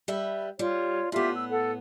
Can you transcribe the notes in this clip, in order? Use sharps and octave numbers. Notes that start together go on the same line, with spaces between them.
G3 B4 E5
G3 F4 C#5
A2 B3 F4 G4 E5
E6
A4 F#5